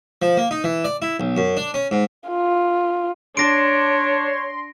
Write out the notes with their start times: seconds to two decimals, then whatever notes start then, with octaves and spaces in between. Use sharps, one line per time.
0.22 F3
0.37 A#3
0.51 D#4
0.64 E3
0.85 D5
1.02 E4
1.20 B1
1.37 F#2
1.57 D4
1.74 C#4
1.91 G#2
2.29 F4
3.37 D4 C#5 C6 A#6 D7